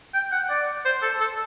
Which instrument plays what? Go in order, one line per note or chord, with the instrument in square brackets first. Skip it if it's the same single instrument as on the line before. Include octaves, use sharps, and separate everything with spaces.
[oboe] G5
F#5
D5
C5
A4
A4